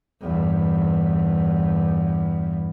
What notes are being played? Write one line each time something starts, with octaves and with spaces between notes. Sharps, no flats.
E2 G2